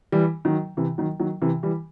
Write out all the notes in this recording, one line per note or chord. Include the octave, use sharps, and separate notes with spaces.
E3 G3
D#3 F#3
C3 E3
D#3 F#3
D#3 F#3
C3 E3
E3 G3